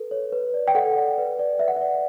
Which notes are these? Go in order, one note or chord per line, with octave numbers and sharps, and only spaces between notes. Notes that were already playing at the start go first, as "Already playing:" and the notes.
Already playing: A4 B4
C#5
B4
D5
G5
A4 F#5
D5
B4
D5
B4 E5
F#5
D5 E5